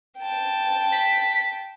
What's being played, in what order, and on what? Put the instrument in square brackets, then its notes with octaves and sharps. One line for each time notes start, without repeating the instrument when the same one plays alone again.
[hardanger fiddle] G5 A5
[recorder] B6